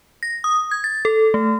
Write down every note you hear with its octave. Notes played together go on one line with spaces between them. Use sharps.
A#6
D#6
G#6
A6
A4
A3